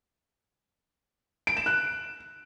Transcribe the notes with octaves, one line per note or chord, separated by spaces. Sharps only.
D7
E7
F#6